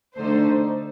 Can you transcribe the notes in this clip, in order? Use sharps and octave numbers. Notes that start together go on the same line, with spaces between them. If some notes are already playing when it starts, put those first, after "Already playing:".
D3 A3 D#4 C5